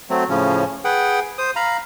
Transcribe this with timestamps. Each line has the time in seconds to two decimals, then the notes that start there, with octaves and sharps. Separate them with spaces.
0.10 F#3 A3 C4
0.29 A2 C#3 F3 C#4
0.85 G#4 B4 F#5 G5
1.38 C5 D#6
1.56 F5 A#5 B5